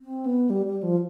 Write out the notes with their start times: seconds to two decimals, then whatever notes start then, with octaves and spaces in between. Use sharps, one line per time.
0.01 C4
0.26 B3
0.50 G3
0.66 G3
0.83 F3